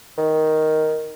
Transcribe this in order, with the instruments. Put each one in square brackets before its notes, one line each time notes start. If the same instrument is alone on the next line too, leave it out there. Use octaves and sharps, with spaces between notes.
[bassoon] D#3